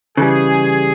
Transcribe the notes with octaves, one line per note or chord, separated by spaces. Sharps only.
C#3 E3 G3 G#4